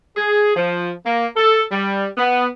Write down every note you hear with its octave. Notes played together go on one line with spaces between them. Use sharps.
G#4
F3
A#3
A4
G3
B3